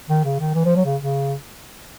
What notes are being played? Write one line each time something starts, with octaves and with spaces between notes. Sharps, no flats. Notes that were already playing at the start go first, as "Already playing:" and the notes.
D#3
C#3
D#3
E3
F3
F#3
C#3
C#3